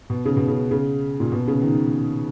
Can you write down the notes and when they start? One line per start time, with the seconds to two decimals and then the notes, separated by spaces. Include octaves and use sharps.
0.10 B2
0.25 C#3
0.37 B2
0.48 C#3
0.71 C#3
1.20 A#2
1.32 B2
1.48 C#3
1.62 D#3